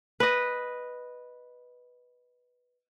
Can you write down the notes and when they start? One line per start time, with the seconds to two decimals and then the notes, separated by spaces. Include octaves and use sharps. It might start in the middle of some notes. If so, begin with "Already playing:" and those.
0.20 B4 D#5